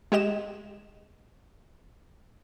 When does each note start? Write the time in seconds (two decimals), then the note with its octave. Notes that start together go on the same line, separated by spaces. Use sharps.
0.12 G#3 G4 D#5 E7